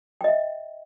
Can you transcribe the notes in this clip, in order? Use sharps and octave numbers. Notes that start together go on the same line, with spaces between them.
D#5 E5 G5